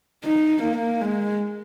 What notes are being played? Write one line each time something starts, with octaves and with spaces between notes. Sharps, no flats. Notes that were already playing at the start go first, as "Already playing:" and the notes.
D#4
A#3
G#3